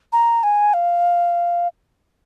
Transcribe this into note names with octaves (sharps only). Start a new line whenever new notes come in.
A#5
G#5
F5